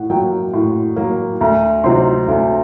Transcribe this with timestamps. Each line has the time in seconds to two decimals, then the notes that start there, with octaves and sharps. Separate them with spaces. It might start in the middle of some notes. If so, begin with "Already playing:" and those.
Already playing: A2 F#5
0.10 F#3 A#3 G5
0.54 A2
0.96 F#3 A#3
1.41 D2 A#5
1.84 C3 F#3 C4 D#4 C6
2.28 D2